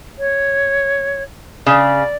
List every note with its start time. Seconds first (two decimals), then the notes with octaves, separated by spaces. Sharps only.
0.18 C#5
1.66 C#3 D5